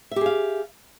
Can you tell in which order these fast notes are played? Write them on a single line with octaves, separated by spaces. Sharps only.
E5 G4 G#4 F5